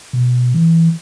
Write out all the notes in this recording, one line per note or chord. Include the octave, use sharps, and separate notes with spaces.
B2
E3